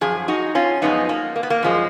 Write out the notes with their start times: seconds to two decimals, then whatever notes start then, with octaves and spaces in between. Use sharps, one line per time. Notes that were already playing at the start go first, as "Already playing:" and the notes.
0.01 F#2 F3 G#4
0.28 D#4 F#4
0.55 C#4 F4
0.82 F#2 F3 G#3 B3 D#4
1.09 A#3
1.36 A#3
1.43 B3
1.50 A#3
1.63 F#2 F3 G#3